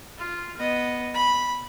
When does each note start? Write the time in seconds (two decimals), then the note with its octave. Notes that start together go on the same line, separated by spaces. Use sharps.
0.18 F4
0.57 B3 D#5
1.14 B5